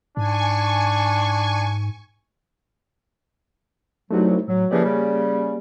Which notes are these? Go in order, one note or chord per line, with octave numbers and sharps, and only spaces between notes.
G#2 D4 G#5 C#6
C2 F#3 A3 D#4 F#4
A2 F#3
C#3 E3 F3 A#3 G4 D5
C#3 G3